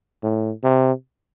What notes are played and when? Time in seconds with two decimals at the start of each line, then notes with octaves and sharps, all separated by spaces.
0.23 A2
0.64 C3